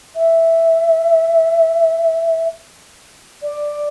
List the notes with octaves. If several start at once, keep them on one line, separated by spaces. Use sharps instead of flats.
E5
D5